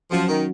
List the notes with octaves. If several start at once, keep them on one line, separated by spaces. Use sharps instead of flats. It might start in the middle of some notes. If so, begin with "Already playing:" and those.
F3 F#3 C#4 F#4
D#3